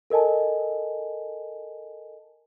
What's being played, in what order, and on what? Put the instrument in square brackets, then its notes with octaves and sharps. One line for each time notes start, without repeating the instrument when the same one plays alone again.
[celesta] A4 A#4 D#5 G#5 A5